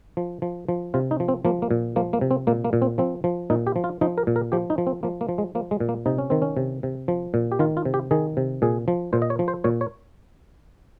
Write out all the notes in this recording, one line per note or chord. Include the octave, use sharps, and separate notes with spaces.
F3
F3
F3
C3 F4
D#4
F3
C4
F3 A#3
A#3
A#2
F3 A#3
A#3
C3
C4
A#2 A#3
A#3
A#2
C4
F3 C4
F3
A#2 D#4
G4
F3
F4
F3 D#4
A#4
A#2
A#4
F3 G4
D#4
F3
C4
F3 A#3
A#3
F3
G#3
F3 A#3
G#3
A#2
A#3
C3 D#4
C#4
D#3 C4
C#4
C3
C3
F3
A#2
G4
D#3 F4
F4
C3
G4
D#3 G#4
C3
A#2 G#4
F3
A#2 C5
D#5
C#5
F3
C5
A#2 C#5
C#5